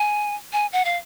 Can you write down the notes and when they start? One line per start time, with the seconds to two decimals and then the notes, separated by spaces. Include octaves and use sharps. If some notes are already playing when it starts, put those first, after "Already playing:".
Already playing: G#5
0.53 G#5
0.73 F#5
0.85 F5